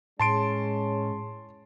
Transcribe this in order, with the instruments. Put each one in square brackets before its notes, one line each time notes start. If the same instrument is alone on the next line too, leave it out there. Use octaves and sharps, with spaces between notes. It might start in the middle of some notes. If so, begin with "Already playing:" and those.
[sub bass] A2 [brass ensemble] G#3 C#4 [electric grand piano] A5 C6 D7